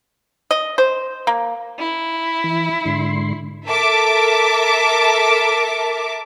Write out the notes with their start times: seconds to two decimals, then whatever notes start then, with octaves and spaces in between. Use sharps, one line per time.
0.51 D#5
0.78 C5
1.27 A#3
1.79 E4
2.44 E3
2.85 G#2 D3 C6
3.67 A4 A#4 E5 A5 D6